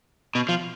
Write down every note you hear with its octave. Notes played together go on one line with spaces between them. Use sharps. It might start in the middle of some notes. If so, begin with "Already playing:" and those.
B2
F3